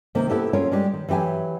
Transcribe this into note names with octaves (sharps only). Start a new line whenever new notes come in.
C3 D#3 A#3 D#4
B3 E4 G4 A4 B4
C#4 F4 G#4 A#4 C#5
G3 G#3 G4
D#3
E3 F#3 G4 E5 G#5